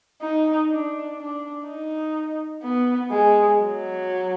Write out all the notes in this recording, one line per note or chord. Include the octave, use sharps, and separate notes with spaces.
D#4
D4
D4
D#4
B3
G#3
F#3